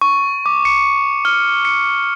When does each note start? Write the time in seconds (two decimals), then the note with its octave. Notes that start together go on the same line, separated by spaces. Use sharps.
0.01 C#6
0.46 D6
0.65 C#7
1.25 F6
1.65 C#7